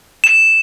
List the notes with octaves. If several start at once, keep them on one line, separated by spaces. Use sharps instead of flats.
E7